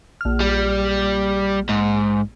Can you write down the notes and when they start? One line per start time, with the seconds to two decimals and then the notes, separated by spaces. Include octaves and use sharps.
0.21 A#1 F6
0.40 G3
1.69 G#2